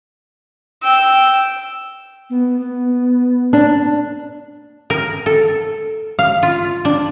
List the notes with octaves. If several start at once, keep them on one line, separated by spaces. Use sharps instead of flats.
G5 E6
B3
B3
D4
A#4
A4
F5
F4
D4